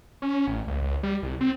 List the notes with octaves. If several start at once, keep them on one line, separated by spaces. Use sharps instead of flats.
C#4
A1
C#2
C#2
G3
C2
C4